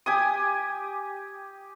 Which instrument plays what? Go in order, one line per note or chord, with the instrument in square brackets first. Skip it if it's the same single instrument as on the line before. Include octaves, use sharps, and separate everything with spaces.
[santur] G4 G#5 D#6